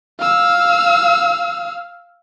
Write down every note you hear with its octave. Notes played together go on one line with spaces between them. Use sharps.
F5 E6